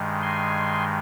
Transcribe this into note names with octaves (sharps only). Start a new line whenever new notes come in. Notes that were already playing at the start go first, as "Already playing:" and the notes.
Already playing: G2 D#3 G#3
G#5 C6